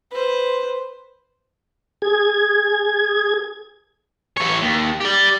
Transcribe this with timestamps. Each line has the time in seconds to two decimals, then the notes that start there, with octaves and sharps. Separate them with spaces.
0.11 B4 C5
2.02 G#4 G#6
4.37 E3 C#5
4.62 D#2
5.00 G4 D5